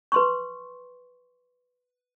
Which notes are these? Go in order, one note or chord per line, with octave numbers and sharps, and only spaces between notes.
B4 C6 C#6